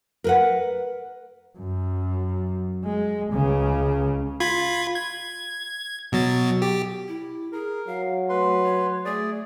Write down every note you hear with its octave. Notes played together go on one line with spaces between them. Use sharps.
A#4 B4 F#5
F#2
G#3
C#2 C#3
F4 B5 G#6
G#6
B2 F#3 A6
G4
E4
G#4 A#4
F#3 F5
A3 B4 C6
C#5
A3 G#4 D5